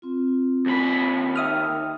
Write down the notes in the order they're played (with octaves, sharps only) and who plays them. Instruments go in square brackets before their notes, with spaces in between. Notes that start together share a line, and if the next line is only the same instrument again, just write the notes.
[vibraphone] C4 F4
[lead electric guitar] D#2 B5
[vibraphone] D#4 G5 [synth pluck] E5 D#6 F6